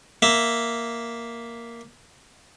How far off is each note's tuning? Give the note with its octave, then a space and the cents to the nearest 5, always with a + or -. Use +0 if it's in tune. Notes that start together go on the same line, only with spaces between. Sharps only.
A#3 +0 E5 +0